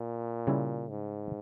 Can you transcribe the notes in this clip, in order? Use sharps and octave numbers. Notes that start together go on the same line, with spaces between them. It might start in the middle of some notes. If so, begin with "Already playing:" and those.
Already playing: A#2
C#3 G3 C#4 E4
G#2